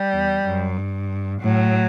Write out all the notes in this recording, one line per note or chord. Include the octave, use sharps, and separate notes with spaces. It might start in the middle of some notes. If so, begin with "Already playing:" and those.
Already playing: G3
E2
F#2
G2
A2 F#3